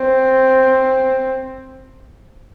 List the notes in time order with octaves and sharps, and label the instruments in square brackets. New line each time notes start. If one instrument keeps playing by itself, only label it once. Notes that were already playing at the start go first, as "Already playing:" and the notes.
Already playing: [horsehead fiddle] C4